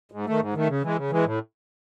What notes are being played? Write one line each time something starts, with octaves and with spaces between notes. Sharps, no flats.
G#2
D#3 A3
G#2
D#3 A3
C#3
E3 G#3
C#3
E3 G#3
A2